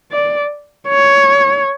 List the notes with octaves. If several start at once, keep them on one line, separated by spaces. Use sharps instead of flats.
D5
C#5